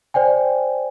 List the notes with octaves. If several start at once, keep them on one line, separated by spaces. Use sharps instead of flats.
C5 D5 G5 G#5